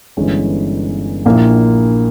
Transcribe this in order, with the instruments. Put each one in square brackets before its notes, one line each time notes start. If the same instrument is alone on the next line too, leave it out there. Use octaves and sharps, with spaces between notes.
[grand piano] G1 G2 E3 G#3 C#4
A#1 A#2 A#3 E4